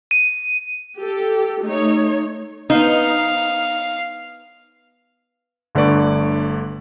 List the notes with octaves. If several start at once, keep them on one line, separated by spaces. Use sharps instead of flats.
D#7
G4 A4
A3 D#4 C#5
B3 D#4 C5 F5
G1 D3 A3 B4 D5 C#6